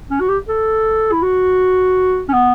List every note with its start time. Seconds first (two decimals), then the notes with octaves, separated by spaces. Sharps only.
0.11 C#4
0.20 F#4
0.29 G4
0.48 A4
1.12 E4
1.22 F#4
2.29 C#4
2.33 B3